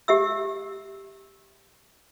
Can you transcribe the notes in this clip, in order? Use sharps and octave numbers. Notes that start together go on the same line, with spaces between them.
G4 E5 E6